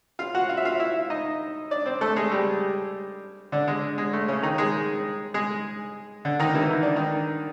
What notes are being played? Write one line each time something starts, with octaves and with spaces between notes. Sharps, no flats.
F4 F5
F#4 F#5
F4 F5
E5
F4 F5
E4 E5
D#4 D#5
D4 D5
C4 C5
A3 A4
G#3 G#4
G3 G4
D3 D4
G#3
G#3
A3
C#3 C#4
D#3 D#4
G#3 G#4
G#3 G#4
D3 D4
D#3 D#4
E3 E4
D#4
D4
D#3 D#4